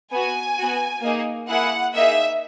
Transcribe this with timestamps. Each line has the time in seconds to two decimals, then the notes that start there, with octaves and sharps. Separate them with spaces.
0.13 B3 F#4 G#5
0.58 B3 F#4
1.03 A#3 D#4 G#4
1.49 A#3 E4 G#4 F#5
1.95 A#3 D#4 G#4 E5